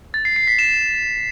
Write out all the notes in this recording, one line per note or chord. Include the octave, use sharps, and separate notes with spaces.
A6
C7
C7
B6
E7